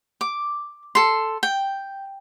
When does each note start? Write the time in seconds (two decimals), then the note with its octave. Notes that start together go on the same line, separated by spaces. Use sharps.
0.21 D6
0.95 A4 C6
1.43 G5